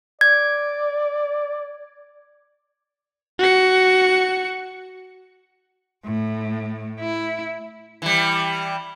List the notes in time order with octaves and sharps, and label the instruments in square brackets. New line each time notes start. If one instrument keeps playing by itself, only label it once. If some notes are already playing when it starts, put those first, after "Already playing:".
[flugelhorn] D5 [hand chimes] G#6
[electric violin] F#4 C#7
[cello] A2
E4
[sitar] E3 G3